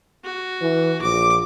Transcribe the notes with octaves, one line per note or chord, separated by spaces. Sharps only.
F#4
E3
A#1 D6